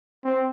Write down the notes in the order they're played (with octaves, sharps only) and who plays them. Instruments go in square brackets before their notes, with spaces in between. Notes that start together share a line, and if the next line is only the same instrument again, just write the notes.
[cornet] C4